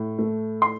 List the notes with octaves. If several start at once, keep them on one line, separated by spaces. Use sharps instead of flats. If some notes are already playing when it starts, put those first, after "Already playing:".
Already playing: A2
A3
C6